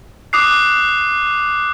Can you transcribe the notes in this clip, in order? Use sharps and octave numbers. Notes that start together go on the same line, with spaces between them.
D6 D#6 F#6 C7